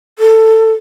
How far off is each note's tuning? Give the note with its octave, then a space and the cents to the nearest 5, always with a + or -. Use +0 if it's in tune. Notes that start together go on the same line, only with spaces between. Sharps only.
A4 +15